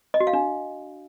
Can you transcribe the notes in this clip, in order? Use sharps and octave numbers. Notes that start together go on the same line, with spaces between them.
D#5
F#4
F5
D4